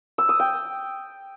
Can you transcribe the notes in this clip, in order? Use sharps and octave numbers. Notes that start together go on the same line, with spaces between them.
E6
D#6
G5